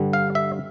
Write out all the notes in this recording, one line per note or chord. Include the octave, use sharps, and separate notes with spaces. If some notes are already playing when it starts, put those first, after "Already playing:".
Already playing: G2 D3 G3
F5
E5